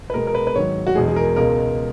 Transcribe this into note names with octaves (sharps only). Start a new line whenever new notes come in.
B4
B2 G#3 B3 A#4
A#4
B4
B4
G#2 D#3 F#3 C#5
F#4
E2 B2 G#3 G#4
G#4
A#4
C#2 B2 G#3 A#4